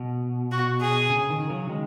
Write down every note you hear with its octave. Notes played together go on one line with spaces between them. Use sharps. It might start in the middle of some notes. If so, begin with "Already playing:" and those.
Already playing: B2
F#4
G#4
C#3
D#3
C#3 F#3
D#3 G#3